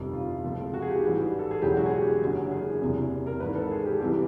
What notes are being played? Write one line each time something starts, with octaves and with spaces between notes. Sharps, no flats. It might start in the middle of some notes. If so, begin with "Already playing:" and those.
Already playing: G1 F2 C3 D#3 G3
F4
C#2 C3 F3 A3
F#4
G#4
G4
A1 G#2 E3 G3
A4
G#4
E1 E2 C#3 F#3 G4
F#4
G#4
G4
F#1 F#2 D3 F#3
G#4
F#1 E2 C3
A#4
G#1 G#2 E3 B4
A4
G#4
G4
C2 C3 E3 G4